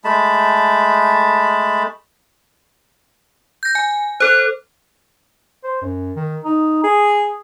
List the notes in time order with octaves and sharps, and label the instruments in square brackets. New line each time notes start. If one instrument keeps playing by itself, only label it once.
[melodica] G#3 A3 A5 B5
[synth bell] G6 A#6
G#5
[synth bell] A4 C5 [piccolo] F#6
[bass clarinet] C5
F#2
D#3
D#4
G#4